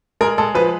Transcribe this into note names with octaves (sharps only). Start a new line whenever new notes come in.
G#3 A#4
G#3 A4
F3 B4